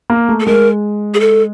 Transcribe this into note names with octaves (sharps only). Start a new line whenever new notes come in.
A#3
A3
A4
G#3 A#4
G#4
A4